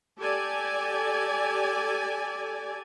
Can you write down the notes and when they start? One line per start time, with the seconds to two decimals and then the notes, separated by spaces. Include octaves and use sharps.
0.19 G4 A4 D5 G#5